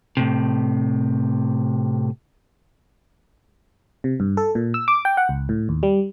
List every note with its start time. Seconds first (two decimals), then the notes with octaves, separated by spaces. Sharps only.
0.17 A2 C3
4.04 C3
4.20 G2
4.37 A4
4.55 A#2
4.74 E6
4.88 D6
5.05 G5
5.17 F#5
5.29 C#2
5.49 A2
5.69 D#2
5.83 G3